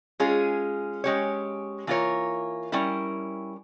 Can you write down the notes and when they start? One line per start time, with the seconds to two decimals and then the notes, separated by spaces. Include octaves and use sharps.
0.20 G#3 C#4 F4 G#4
1.04 G#3 C#4 G4 C#5
1.87 E3 A#3 F4 A#4 C#5
2.72 G3 C#4 E4 A#4